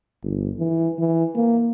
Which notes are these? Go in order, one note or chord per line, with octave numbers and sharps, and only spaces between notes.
G1
E3
E3
A#3